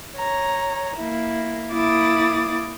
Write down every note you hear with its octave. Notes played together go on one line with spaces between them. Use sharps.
C#5 A#5
A#3 E4
A#3 E4 D6 D#6 A6